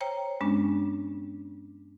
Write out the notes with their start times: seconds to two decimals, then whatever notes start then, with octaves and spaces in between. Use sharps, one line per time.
0.01 C5 C#5 G5 A#5
0.41 G2 G#3 B3 C#4 D4